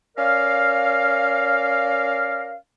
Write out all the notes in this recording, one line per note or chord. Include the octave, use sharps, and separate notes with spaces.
C#4 A#4 D5 F5